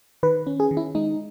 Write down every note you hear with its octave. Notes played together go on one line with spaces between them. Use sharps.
D#3 B4
C#4
G#4
D#3
E4
G#3 D#4